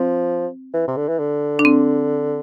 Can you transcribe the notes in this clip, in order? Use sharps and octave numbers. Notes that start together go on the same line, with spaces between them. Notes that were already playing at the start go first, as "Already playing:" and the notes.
Already playing: F3 C4
E3
C3
D3
E3
D3
D4
C4